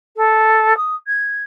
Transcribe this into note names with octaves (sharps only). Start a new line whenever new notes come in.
A4
D#6
G#6